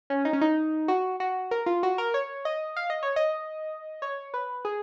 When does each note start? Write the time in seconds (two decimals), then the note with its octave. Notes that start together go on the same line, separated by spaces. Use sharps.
0.10 C#4
0.25 D#4
0.33 C#4
0.41 D#4
0.88 F#4
1.20 F#4
1.51 A#4
1.66 F4
1.83 F#4
1.98 A#4
2.14 C#5
2.45 D#5
2.76 F5
2.90 D#5
3.03 C#5
3.16 D#5
4.02 C#5
4.34 B4
4.65 G#4